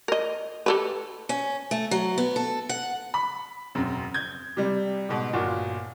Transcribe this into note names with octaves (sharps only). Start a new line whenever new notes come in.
A#4 D#5
G4 A4 B4
C#4
A3
F#3
B3
A4
F#5
B5
E1 F#2 C4
G6 G#6
C3 G3
G#2 B2
G1 A#2 F4 F#4